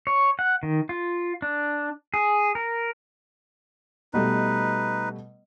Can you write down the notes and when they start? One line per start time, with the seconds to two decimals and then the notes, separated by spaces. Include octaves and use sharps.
0.07 C#5
0.39 F#5
0.63 D#3
0.89 F4
1.42 D4
2.14 G#4
2.55 A#4
4.14 B2 G3 A3 D#4 B4